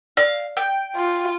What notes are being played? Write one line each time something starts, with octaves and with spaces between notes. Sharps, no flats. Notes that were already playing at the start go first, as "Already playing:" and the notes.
D5 F5
G5
F4